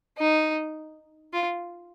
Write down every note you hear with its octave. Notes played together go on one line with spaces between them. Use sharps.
D#4
F4